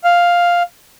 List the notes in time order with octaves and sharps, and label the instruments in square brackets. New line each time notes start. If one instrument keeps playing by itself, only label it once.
[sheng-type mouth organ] F5